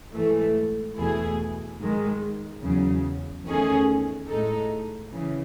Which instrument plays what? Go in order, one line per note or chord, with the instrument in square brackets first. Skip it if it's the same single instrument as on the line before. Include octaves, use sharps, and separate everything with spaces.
[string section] G#2 E3 A3
E2 B2 A3 E4 G#4
G#2 D#3 G#3
E2 C#3 F#3
E2 D#3 A3 C#4 G#4
A2 G#3 D#4 A4
C#3 E3